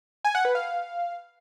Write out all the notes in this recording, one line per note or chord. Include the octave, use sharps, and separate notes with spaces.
G#5
F#5
B4
F5